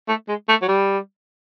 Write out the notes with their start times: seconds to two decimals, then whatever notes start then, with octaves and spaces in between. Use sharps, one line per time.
0.08 A3
0.28 G#3
0.49 A3
0.62 F#3
0.68 G3